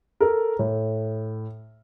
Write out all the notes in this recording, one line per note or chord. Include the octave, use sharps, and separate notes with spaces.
A4 A#4
A2